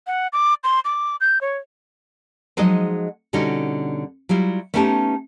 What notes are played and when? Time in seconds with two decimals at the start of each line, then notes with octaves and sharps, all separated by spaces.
0.07 F#5
0.33 D6
0.64 C6
0.85 D6
1.21 G6
1.41 C#5
2.57 F3 F#3 G#3 D#4 G#4 D#5
3.33 B2 D3 G3 C#4 D#4 F#4
4.29 F#3 G3 E4 F4
4.74 A3 B3 C#4 D#4 G4 A5